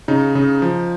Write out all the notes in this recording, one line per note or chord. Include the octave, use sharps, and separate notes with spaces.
C#3 D#4
C#3
F3